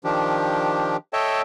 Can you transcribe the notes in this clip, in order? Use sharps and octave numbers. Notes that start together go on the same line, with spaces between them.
D#3 F3 D4 G4
A4 C#5 D#5 E5 G5 A5